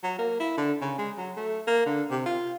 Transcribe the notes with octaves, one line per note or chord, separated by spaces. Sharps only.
F#3
A#3
E4
D3
C#3
G#3
F#3
A3
A#3
D3
C3
F4